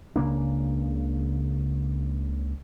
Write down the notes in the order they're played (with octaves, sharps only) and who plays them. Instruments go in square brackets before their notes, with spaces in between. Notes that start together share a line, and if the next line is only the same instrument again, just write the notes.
[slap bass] C#2 C#3 A#3 D4